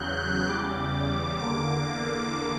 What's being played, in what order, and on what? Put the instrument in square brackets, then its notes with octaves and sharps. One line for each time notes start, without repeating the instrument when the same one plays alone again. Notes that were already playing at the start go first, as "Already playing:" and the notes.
Already playing: [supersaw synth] E2 C#3 F#3 F#6 G6
F#6
E2 C#3 G3 D6
E2 D3 A#3 D6